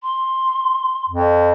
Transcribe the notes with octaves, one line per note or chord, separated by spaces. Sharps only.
C6
F2